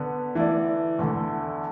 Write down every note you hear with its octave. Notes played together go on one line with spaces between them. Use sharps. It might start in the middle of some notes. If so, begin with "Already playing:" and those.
Already playing: D3 B3 D4
E3 A3 E4 D5
E2 D3 A3